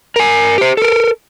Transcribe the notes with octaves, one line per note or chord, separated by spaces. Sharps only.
A#4 G#5
G4 C5
A4 A#4